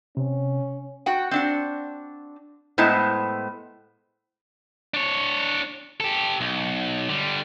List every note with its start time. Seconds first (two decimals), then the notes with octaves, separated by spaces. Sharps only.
0.17 C3 C#4
1.06 F#4 F#5 G5
1.31 C4 D4 F#5
2.78 A2 G#3 B3 E4 C5 A5
4.94 D4 C#5
6.00 G4 A4
6.41 B1
7.09 D3 G3